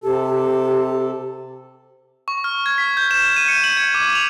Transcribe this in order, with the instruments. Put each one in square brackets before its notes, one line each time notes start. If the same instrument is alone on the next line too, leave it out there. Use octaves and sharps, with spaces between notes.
[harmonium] C3 A4 [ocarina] G4
[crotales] C#6
F6
G#6
B6
G6
E7
D#7
C#7
F#7
G#6
D6
F7